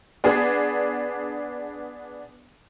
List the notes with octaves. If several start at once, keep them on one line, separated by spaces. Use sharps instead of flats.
B3 D4 G#4